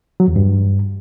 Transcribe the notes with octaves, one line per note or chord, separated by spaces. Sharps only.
F#3
E2
G2